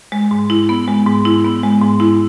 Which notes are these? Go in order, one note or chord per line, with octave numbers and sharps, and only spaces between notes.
G#3
G#2
E4
B3
G#3
G#2
E4
B3
G#3
G#2
E4